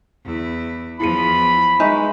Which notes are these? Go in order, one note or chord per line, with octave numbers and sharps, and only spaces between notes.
E2 E4
E2 F3 E4 G#4 B5 D#7
G#3 D#4 B4 E5 G#5 A#5 C#6